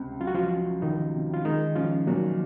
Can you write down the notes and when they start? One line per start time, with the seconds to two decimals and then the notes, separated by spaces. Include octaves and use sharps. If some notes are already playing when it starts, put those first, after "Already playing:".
Already playing: C#2 C3
0.20 F#3 F4
0.27 F#4
0.34 F3 F4
0.52 C#4
0.82 C#2 D#3 D#4
1.14 C3
1.33 F4
1.44 D#3 G#3 D#4
1.75 F3 C#4 F4
2.07 A#2 F#3 F#4